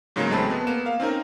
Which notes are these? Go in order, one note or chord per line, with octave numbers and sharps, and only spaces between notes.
G#2 C#3 F#3 G#3 A#3
A1 G#3 A3 C4 A5 B5
B3
A#3 B3 E7
A#3 F5
C4 C#4 D#4 A#4